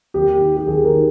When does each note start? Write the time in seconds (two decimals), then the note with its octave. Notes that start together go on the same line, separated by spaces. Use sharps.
0.14 D#2 G4
0.40 D#3
0.57 G4
0.67 D#2 G#4
0.84 A#4
0.93 D#3